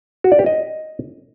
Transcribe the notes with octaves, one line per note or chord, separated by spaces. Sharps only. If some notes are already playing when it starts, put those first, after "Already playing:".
F#4
D5
G4
D#5